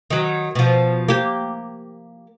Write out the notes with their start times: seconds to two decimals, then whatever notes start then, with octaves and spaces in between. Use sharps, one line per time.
0.10 D#3 F#3
0.55 B2 F3
1.08 A#3 G4